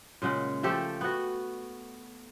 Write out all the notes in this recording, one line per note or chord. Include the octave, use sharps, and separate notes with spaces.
A#2 C#3 G#3 F#5
F3 A3 G4 A4
B3 F#4